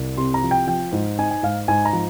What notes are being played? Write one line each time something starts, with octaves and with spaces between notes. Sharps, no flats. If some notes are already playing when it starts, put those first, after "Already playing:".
Already playing: C2
C3 C6
A#5
F3
G5
F3 G5
G#2
D#4 G#5
G#5
G#2 F5
G#2 G#5
A#5
F3